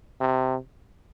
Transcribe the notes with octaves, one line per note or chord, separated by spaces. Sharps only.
C3